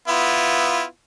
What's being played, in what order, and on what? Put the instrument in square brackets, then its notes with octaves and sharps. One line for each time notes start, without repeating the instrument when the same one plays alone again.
[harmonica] B3 E4 F4